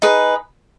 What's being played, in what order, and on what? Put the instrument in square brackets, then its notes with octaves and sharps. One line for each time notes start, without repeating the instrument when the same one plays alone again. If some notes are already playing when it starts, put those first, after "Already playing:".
[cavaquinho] D#4 G#4 B4